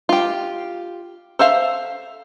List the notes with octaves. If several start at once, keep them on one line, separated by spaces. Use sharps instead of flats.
F4 G4
A4 C5 E5 F5